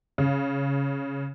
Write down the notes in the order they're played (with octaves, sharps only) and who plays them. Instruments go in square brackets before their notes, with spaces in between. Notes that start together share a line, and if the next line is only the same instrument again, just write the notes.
[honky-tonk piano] C#3